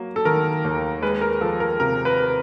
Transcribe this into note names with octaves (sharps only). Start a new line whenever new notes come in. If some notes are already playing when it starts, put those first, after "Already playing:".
Already playing: F#3 A#3
A4
D#3 A#4
D#2
G#3 B4
A#4
F3 A4
A#4
C3 A#4
B4